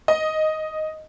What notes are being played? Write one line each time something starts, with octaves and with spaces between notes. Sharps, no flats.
D#5